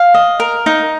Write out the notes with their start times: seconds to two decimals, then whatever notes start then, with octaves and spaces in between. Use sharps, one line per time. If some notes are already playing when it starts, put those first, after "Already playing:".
Already playing: F5
0.14 D#5
0.40 A#4
0.66 D#4